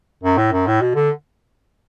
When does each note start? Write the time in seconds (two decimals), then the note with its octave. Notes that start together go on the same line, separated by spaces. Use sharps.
0.23 F#2
0.38 A2
0.52 F#2
0.67 A2
0.81 B2
0.95 D3